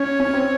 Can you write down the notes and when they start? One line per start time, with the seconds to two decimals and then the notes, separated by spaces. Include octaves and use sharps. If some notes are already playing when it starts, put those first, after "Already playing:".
Already playing: C#4 C#5
0.20 C#4
0.34 C4